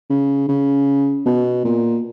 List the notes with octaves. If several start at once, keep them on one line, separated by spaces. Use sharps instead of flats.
C#3
C#3
B2
A#2